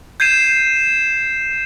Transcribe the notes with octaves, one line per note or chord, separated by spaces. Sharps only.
G6 G#6 C7 D#7 E7